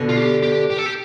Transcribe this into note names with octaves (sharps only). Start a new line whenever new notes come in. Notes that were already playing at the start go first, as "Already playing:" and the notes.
Already playing: B2 D3
F4
G4
G4
G4
A4
G4